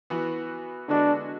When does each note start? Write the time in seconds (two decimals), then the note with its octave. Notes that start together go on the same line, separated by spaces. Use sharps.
0.10 E3 B3 F#4
0.88 D3 G#3 B3 D4 F#4